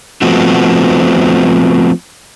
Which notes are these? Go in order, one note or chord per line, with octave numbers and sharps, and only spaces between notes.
F3 A3 B3 C4 F#4